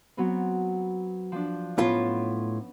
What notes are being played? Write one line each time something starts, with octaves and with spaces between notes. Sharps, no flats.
F#3 B3 C4
F3 D4
A2 B3 C#4 F4